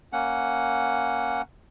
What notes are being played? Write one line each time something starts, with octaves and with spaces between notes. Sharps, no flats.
A#3 C#4 F#5